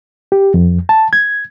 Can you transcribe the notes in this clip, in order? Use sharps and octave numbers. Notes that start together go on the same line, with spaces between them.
G4
F2
A5
G#6